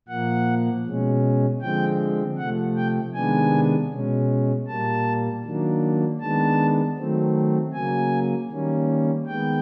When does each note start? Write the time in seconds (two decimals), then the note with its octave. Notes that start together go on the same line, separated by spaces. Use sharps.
0.08 A#2 F3 A#3 F#5
0.85 B2 G#3 C#4
1.62 D3 F3 G#3 C4 G5
2.38 C3 F3 A3 F#5
2.76 G5
3.14 C3 D#3 G#3 B3 D4 G#5
3.91 B2 G#3 C#4
4.67 A#2 G3 A#3 A5
5.44 D#3 F#3 A#3 D4
6.20 D#3 G#3 B3 D4 A5
6.97 D#3 F#3 A3 C4
7.73 C#3 F#3 A#3 G#5
8.50 D#3 G3 A#3 C#4
9.26 D#3 G#3 B3 G5